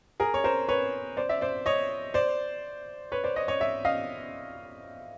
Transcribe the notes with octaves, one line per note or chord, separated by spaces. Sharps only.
G#4 A#4
C#5
A#4 C5
B4 C#5
C5 D5
D5 E5
C5 D5
C#5 D#5
C5 D5
B4 C#5
C5 D5
C#5 D#5
C#5 D#5
D5 E5
D#5 F5